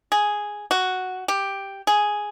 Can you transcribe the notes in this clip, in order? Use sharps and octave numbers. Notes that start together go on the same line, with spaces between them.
G#4
F#4
G4
G#4